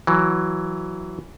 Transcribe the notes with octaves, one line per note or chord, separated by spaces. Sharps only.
E3 F#3